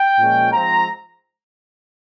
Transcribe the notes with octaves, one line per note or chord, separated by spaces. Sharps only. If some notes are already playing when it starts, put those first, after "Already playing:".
Already playing: G5
A#2 F3 G#3 C#4
G#2 F3 C4 F4 A#5